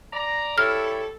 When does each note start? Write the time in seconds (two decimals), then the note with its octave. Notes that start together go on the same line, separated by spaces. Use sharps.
0.13 D5 A#5
0.58 G3 E4 A4 C#5 F6